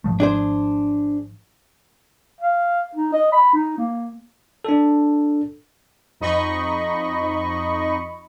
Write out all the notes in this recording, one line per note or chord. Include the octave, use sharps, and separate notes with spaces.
G#1 F3 A3
D4 G#4 C5
F5
D#4
D#5
B5
D#4
A#3
D4 A4
F2 D#4 D#5 B5 C#6